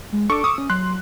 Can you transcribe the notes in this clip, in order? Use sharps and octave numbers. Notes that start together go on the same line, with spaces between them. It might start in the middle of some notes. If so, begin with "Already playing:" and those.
G#3
D4 A4 C#6 D6
D#6 E6
C#4
F#3 C6 F#6